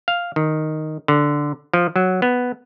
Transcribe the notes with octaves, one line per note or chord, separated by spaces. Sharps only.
F5
D#3
D3
F3
F#3
B3